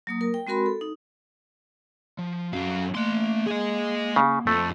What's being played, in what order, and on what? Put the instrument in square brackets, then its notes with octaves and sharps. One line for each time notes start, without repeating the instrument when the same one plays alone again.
[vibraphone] F#3 A#3 D#6
A#4
G5
G#3 C4 F#4 A#4 B5 C6
A4
D#4
[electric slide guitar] F3
[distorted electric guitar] F#2 F#3 [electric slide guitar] A4 F5
[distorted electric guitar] A3 C6 [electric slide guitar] A#3
[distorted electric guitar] G#4 D#5
[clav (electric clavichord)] C#3
[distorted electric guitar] F2 [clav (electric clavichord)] A3 A4